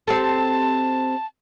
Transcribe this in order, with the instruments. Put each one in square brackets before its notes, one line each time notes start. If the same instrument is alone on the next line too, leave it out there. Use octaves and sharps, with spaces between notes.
[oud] C4 G4 A4 [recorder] A5